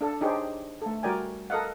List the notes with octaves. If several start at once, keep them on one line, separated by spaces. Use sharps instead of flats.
D4 A4
D4 D#4 G4 G#4 C5 C#5
A3 A4
G3 F#4 A#4 D5 G5 G#5
A4 A#4 D#5 F5 F#5